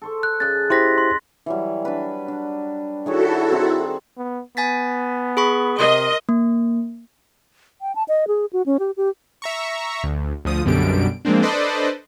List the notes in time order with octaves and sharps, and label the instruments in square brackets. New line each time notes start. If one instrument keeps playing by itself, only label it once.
[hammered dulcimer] A4 C5 C#6
[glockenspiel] F#6
[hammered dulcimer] C#3 D#5 [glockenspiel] F#6 A6
[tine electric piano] E4 G4 C5 [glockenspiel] C6 A#6 B6
[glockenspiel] C6
[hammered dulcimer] E3 F#3 G3
D4 B4
D4
[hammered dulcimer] D#3 G#4 C#5 [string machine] E4 F#4 A4
[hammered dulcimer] C4 D#4
[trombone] B3
[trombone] B3 [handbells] G#5 A6 B6
[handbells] G#4 B5 C#6
[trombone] C3 [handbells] A#4 C6 [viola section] D#5
[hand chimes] A#3
[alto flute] G5
A5
D#5
G#4
F#4
C#4
G4
G4
[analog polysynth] E5 A#5 C#6
D2
D2 F3 D#6
B1 F#2 B2 D3 G3 D7
F3 G#3 A#3 C4 D4
D4 A4 B4 C5 D5 D#5